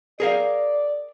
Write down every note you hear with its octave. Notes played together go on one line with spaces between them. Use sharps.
G#4 A#4 D5 F5